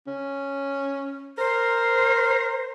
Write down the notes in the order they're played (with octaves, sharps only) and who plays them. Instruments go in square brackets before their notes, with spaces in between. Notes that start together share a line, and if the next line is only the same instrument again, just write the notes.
[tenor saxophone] C#4
[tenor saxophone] A#4 [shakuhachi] C5